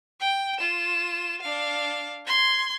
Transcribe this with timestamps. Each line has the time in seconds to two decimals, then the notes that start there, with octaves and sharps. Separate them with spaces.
0.20 G5
0.58 F4 E7
1.41 D4 F5
2.26 C6 G#6